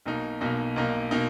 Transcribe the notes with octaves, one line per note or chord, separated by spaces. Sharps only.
B1 B2 A#3 D#4
B1 B2 A#3 D#4
B1 B2 A#3 D#4
B2 A#3 D#4